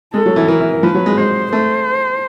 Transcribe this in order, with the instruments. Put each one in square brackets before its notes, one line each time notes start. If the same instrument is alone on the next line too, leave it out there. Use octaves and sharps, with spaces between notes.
[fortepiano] G#3 [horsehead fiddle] A4
[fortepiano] F#3
E3
[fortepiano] E3 [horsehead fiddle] A#4
[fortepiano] E3
E3
[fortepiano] F3 [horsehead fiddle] B4
[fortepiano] F#3
G#3
[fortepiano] G#3 [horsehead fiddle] C5
[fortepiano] A3 [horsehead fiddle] C5